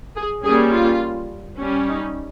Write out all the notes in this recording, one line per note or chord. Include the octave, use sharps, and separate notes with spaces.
G#4
G3 A#3 C#4 G#4
F4
G3 C#4
D#4